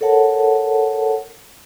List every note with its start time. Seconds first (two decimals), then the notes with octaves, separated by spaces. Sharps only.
0.01 A4 A#4 C#5 F#5 A5